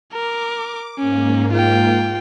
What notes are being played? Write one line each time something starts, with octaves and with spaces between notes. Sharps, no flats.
A#4 D6
G#2 A#3 C#4
F4 G5